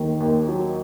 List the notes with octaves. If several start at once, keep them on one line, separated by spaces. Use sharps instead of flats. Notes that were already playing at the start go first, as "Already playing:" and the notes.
Already playing: D#2 D#3
D#2
F#3